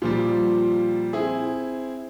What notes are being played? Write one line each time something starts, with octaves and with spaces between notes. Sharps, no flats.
A#2 F3 G3
C4 E4 G#4